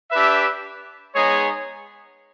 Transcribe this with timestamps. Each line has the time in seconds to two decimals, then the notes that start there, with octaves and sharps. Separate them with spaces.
0.11 D4 G4 B4 E5
1.14 G#3 B3 D#4 G#4 C#5